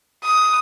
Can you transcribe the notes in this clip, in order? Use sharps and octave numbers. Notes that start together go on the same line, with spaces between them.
D#6